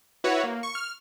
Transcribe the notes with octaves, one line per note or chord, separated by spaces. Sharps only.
E4 F#4 B4 C#5
A#3
C#6
F6